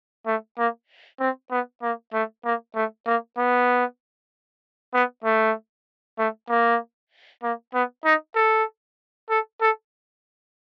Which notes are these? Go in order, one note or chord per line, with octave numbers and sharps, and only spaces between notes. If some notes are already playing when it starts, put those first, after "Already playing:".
A3
A#3
C4
B3
A#3
A3
A#3
A3
A#3
B3
B3
A3
A3
A#3
A#3
B3
D#4
A4
A4
A4